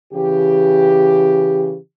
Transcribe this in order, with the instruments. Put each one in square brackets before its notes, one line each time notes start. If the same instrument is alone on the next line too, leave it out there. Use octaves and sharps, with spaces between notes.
[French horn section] C#3 E3 G4